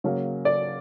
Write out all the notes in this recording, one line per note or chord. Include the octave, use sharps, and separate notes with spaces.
C#3 F#3 A#3
D5